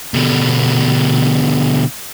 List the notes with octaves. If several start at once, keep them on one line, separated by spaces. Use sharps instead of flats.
B2 D3